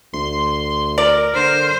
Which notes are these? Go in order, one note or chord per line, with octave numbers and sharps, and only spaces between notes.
D2 C6
A#4 D5
D3 C5